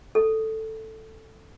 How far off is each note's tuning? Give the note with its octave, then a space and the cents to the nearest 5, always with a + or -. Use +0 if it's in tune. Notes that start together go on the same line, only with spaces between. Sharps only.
A4 +5